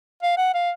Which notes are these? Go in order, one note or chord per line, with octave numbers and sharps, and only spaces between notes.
F5
F#5
F5